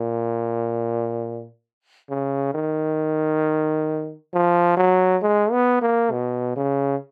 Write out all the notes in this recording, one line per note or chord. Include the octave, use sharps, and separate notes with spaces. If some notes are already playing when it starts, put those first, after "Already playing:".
Already playing: A#2
C#3
D#3
F3
F#3
G#3
B3
A#3
B2
C#3